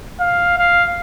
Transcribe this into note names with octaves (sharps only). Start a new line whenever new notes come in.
F5
F5